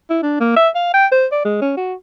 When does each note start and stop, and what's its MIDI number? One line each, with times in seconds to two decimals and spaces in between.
0.10 0.20 64
0.23 0.36 62
0.40 0.52 58
0.56 0.69 76
0.76 0.92 77
0.94 1.06 79
1.12 1.26 72
1.32 1.42 74
1.45 1.57 56
1.62 1.73 61
1.77 1.94 66